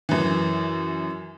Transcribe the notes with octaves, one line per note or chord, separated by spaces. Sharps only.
F#2 E3